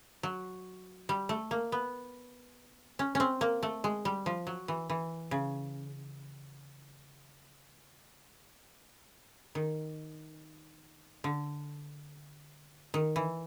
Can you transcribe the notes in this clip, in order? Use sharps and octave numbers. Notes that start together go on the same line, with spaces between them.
F#3
G3
A3
A#3
B3
C#4
C4 C#4
A#3
A3
G#3
G3
F3
F#3
E3
E3
C#3
D#3
D3
D#3
E3